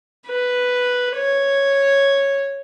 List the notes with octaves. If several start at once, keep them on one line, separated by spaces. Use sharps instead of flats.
B4
C#5